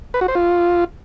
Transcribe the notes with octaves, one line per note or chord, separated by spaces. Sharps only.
B4
F#4
C5
F4